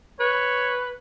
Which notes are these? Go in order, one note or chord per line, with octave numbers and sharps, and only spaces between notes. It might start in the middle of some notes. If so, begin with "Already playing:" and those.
B4 C#5